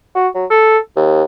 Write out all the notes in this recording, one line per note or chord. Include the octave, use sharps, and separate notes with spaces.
F#4
F#3
A4
D#2